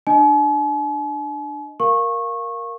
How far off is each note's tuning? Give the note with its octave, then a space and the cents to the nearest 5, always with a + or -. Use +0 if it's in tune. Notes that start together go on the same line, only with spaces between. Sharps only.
D4 +20 D#5 +0 G#5 +45
A#4 +0 F5 +0 C#6 -20